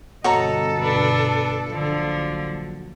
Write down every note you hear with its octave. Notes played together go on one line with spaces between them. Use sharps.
G1 B2 D3 F#4 A4 C#5 D#5 A#5
D4 B4
A#1 D3 F3 F#3